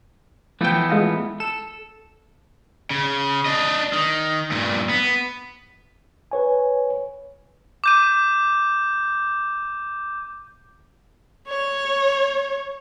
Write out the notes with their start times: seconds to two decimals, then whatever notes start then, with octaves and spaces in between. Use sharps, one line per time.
0.61 E3 F3 A3 B3 G5
0.90 G#3 F4 D#5
1.40 A4 E7
2.91 C#3
3.46 D4 D#5
3.93 D#3
4.51 G2 A#2
4.89 B3
6.31 B4 C#5 G#5
7.84 D6 G6 D#7
11.48 C#5